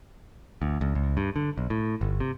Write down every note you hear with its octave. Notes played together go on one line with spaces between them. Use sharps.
D2
C#2
C#2
G2
D3
B1
A2
G1
C3